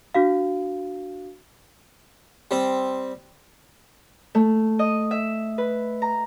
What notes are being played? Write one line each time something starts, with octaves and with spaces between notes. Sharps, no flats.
D4 F#4 F5
G3 C4
A3
D#5
E5
B4
A#5